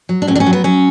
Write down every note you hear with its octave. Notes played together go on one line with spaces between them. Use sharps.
F#3
D4
A2 C#4
D4
C#4
F#3
B3
F#3 C#4